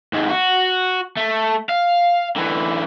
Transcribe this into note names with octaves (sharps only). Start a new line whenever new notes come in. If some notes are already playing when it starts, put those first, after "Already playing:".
D#2 G#2
F#4
A3
F5
D3 E3